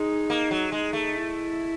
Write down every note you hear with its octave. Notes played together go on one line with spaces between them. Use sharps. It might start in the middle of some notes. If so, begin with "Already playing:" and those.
Already playing: G#3 D#4
A#3
F#3
G#3 D#4
A3
E4